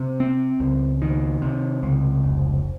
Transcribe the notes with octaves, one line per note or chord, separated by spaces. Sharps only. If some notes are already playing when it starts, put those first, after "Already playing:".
Already playing: C3
C4
C#2
D#3
C3
C#2
F1